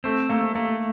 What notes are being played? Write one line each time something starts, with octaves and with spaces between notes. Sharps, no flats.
A3 C4
A3 A#3
A3 A#3